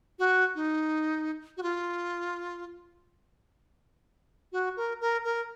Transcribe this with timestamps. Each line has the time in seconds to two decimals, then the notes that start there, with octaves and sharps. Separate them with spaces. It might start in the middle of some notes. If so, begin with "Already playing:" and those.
0.19 F#4
0.55 D#4
1.57 F#4
1.63 F4
4.52 F#4
4.77 A#4
5.01 A#4
5.25 A#4